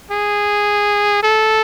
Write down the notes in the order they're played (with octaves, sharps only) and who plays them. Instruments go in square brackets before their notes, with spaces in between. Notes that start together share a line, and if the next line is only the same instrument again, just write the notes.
[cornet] G#4
A4